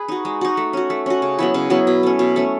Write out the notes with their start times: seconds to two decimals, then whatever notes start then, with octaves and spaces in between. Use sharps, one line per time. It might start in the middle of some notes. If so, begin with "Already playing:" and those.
Already playing: G#4 B4
0.08 D#4 F#4
0.25 G#3
0.41 D#4 F#4
0.57 A3
0.73 C#4 F#4
0.90 A3
1.06 C#4 F#4
1.22 C#3
1.39 F#3 B3 E4
1.54 C#3
1.70 F#3 B3 E4
1.87 B2
2.03 A3 C#4
2.19 B2
2.36 A3 C#4